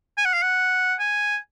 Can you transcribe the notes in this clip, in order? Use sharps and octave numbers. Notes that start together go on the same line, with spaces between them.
G#5
F#5
F5
F#5
G#5